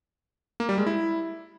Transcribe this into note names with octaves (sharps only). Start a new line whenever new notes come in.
A#3
G3
G#3
E4